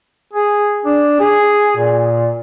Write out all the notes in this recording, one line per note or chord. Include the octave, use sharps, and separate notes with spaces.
G#4
D4
G#4
A#2